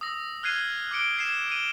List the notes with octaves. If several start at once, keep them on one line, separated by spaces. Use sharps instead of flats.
D#6 E6 A#6
F6 F#6 G#6 C7 D#7 G7
D6 F#6 C#7 D7 G7
G#6 C7 E7
D#7 F7 G7